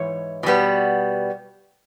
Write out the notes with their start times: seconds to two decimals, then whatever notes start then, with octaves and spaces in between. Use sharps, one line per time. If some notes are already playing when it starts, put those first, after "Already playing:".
Already playing: G#2 E3 C#5
0.43 B2 G3 B3